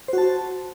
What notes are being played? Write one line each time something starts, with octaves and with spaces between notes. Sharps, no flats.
F#4 C5 A5